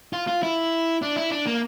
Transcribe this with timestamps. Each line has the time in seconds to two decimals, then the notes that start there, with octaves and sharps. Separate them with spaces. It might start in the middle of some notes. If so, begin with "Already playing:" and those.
0.13 F4
0.27 F4
0.43 E4
1.02 D4
1.16 E4
1.31 D4
1.47 A#3